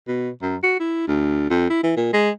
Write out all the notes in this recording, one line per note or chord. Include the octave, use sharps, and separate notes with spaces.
B2
F#2
F#4
E4
D2
F2
E4
E3
A#2
G#3